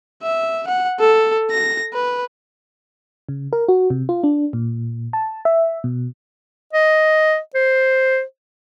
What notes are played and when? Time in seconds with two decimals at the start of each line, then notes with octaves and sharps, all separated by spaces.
0.23 E5
0.68 F#5
1.00 A4
1.51 A#6
1.94 B4
3.29 C#3
3.53 A#4
3.68 F#4
3.90 C3
4.09 F4
4.23 D4
4.53 A#2
5.13 A5
5.45 E5
5.84 B2
6.73 D#5
7.55 C5